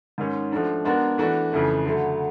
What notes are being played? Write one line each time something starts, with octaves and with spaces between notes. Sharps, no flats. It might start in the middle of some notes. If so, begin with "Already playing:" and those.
G#2 D#3 G#3 C#4
F3 A3 D4 F#4
G#3 B3 D4 F#4 A#4
E3 A3 D4 F#4
F2 C#3 E3 A3
D3 F#3 A3